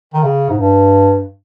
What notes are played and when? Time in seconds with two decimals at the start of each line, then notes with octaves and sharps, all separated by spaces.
0.14 D#3
0.23 C#3
0.49 G#2
0.58 G2